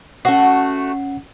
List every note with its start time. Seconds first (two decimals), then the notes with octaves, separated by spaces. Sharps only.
0.25 A3 C#4 F#4 F#5 C7